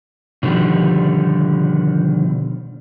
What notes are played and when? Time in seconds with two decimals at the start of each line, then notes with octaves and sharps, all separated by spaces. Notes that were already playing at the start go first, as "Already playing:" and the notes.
0.43 B2 D3 D#3 F3 G3